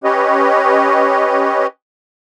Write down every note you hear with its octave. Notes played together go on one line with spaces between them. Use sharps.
C#4 G4 B4 C#5 D#5